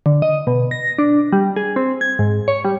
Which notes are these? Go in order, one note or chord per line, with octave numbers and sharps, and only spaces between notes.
D3
D#5
B2
A#6
D4
G3
G#4
C4
G#6
G#2
C#5
G3